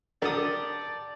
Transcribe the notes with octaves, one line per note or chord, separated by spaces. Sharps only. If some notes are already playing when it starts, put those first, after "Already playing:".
D3 F#3 G4 A4 A#4 D5 D#6